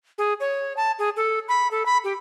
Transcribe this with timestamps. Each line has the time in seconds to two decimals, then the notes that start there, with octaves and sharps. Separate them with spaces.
0.18 G#4
0.40 C#5
0.77 A5
0.99 G#4
1.17 A4
1.48 B5
1.71 A4
1.86 B5
2.04 G4